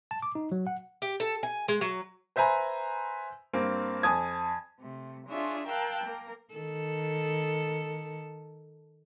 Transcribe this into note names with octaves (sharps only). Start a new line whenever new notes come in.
A5
D6
D#4
F#3
F#5
G4
A4
G#5
G#3
F#3
B4 C5 E5 G#5 A#5 B5
G2 A#3 C4
F2 G#5 A5 D#6 G#6
C3 A3
D4 F4 G#4 C#5 E5
A#4 F5 G5 A5 E6 F#6
A#3 A#4
D#3 A4